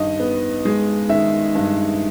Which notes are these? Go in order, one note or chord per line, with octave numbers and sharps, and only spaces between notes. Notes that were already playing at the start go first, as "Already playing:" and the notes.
Already playing: G2 D#3 D#5
B3
G#3
D#3 E5
G2